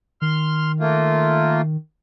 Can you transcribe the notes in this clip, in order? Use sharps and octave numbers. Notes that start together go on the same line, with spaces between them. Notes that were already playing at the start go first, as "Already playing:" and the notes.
D#3 C6 F6
A3 A#3 F4